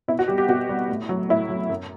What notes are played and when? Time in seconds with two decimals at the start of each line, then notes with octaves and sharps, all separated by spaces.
0.08 B2 E4
0.19 F#4
0.28 G3 G4
0.38 G4
0.48 B2 F#4
0.69 G3
0.89 A2
1.09 F#3
1.29 A2 E4
1.49 F#3
1.70 F#2